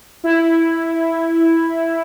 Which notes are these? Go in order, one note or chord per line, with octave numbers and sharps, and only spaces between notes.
E4